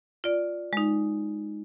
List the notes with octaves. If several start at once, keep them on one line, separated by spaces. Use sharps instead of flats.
F4 D5
G#3 D#4